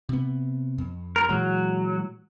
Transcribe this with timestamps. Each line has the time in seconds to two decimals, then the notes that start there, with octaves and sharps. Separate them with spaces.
0.09 C3 B3
0.78 F2
1.16 A#4
1.29 A#2 E3 F#3 G#3